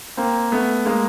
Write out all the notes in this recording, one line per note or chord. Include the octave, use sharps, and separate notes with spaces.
A#3 C4
A3 B3
G#3 A#3